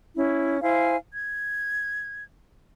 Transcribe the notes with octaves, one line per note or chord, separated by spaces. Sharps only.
C#4 E4
E4 C5 F5 G#5
G#6